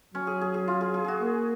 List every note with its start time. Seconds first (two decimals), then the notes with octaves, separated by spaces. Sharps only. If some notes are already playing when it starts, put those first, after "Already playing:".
0.14 F#3 C#4
0.27 G#4
0.41 G#4
0.54 G#4
0.68 F4
0.81 G#4
0.94 G#4
1.04 F#4 G#4
1.21 A#3